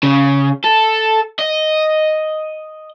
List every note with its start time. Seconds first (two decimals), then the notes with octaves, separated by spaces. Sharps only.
0.03 C#3
0.64 A4
1.39 D#5